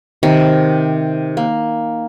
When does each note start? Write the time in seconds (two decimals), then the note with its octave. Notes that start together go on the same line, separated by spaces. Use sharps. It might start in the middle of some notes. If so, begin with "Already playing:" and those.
0.23 C3 D#3
1.37 A#3